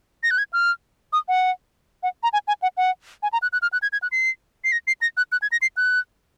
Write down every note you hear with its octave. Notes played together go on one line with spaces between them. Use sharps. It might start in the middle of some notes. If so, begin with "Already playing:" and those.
A#6
F#6
G#6
F6
D#6
F#5
F#5
A#5
G#5
G#5
F#5
F#5
G#5
A#5
F#6
F#6
F6
F#6
G#6
G#6
F#6
C7
C7
A#6
C7
A#6
F#6
F#6
G#6
A#6
C7
F#6